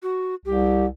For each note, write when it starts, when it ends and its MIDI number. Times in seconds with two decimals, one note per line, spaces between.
0.03 0.34 66
0.46 0.87 36
0.46 0.85 67